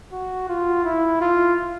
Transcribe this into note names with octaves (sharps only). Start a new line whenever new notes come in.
F#4
F4
E4
F4